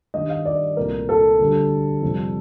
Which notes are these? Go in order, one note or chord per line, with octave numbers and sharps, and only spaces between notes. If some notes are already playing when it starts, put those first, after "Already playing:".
G2 D#3 G3 D#5
F5
D5
C2 A#2 A3 A#4
A4
D2 D3 G3
F2 C3 G3